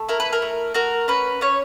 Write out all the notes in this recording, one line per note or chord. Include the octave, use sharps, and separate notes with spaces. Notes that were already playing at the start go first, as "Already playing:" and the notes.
Already playing: A3
E4 A#4
B4
A#4
A3
F#4 A#4
C#4 B4
C#4 C#5